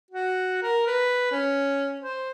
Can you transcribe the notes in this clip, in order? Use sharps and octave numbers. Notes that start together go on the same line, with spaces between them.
F#4
A#4
B4
C#4
C5